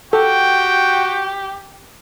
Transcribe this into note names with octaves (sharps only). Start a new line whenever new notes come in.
F#4 G4 A4 G5